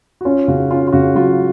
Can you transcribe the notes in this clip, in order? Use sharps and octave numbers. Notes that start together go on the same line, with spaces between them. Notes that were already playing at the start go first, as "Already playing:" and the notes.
F#4
C#4 F4
C#3 F#4
C#4 F4
F4
C#3 F#4
F#3 F4